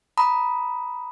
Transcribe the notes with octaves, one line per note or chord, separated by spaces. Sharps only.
A#5 B5 D#6